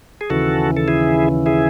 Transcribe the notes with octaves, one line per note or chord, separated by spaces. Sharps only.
G#4
D#2 C#3 E3 F#4 A4
A4
E4 G#4
E4 G#4